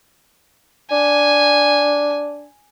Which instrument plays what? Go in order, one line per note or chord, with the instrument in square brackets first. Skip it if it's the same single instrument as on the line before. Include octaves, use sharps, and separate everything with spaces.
[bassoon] D4 [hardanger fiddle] G#5